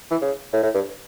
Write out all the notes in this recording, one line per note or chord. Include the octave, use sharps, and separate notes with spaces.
E3
C#3
A2
A2
G2